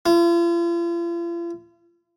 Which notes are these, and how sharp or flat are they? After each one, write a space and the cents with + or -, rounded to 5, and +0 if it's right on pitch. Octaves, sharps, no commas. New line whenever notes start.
F4 -45